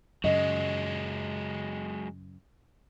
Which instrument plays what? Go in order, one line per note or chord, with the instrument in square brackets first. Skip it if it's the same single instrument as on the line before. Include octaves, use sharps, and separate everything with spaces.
[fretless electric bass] F#2 C#3 [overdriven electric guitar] F#3 G#3 [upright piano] D#5